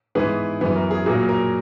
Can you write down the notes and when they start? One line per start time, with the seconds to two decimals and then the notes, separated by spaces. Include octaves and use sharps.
0.15 G#2 E3 B3 G#4 B4
0.61 F#2 E3 B3
0.76 A#4
0.91 G#4
1.06 A#2 F#3 A#3 G#4
1.29 A#4